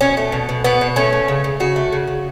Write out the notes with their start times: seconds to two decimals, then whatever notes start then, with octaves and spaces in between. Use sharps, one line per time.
0.01 B2 C#4
0.17 A3
0.32 B2
0.49 B2
0.64 B2 B3
0.81 B2
0.96 A3 C#4
1.13 A3
1.28 C#3
1.44 C#3
1.60 C#3 F#4
1.76 A3
1.92 C#3
2.07 C#3